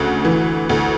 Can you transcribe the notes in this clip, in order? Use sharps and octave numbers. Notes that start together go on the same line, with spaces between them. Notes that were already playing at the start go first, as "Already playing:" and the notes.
Already playing: D2 C#3 F#6
E3
D2